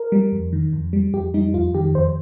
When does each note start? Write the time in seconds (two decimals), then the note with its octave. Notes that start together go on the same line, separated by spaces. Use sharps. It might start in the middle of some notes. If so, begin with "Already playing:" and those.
Already playing: A#4
0.12 G3
0.32 F2
0.53 D#3
0.73 F2
0.93 G3
1.14 F2 G4
1.34 G3 D#4
1.54 F2 F4
1.75 D#3 G4
1.95 F2 C5